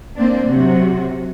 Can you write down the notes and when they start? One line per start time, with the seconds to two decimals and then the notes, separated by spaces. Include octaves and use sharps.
0.15 A#3 C4 D4
0.47 C3 F#3 F#4